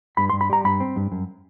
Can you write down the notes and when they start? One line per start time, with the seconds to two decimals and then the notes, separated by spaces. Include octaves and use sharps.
0.17 G2 B5
0.30 G2 C6
0.41 B5
0.50 G3 A#5
0.64 G2 B5
0.80 C4
0.96 G2
1.12 F#2